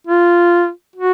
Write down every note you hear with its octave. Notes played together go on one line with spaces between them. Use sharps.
F4
F#4